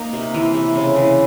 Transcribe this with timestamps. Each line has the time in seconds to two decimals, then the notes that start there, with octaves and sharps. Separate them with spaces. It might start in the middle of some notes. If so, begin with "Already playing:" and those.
Already playing: A#3 D#4
0.13 C3
0.34 E3
0.54 C3
0.76 C#3
0.96 E3